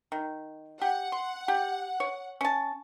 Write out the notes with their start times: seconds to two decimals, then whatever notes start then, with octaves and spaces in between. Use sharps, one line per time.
0.12 D#3
0.81 G4 F#5
1.12 C6
1.48 G4
2.00 C#5
2.41 C#4 A5